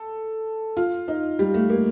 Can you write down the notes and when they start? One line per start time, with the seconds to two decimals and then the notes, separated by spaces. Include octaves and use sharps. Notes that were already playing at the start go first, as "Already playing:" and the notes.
Already playing: A4
0.77 F4
1.08 D#4
1.39 G3
1.54 A3
1.70 A#3